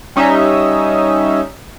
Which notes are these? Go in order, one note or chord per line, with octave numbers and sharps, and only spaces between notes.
G3 C#4 D#4 D#5 E5